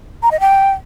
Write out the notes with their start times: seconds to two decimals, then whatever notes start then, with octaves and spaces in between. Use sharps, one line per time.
0.23 A#5
0.31 D#5
0.40 G5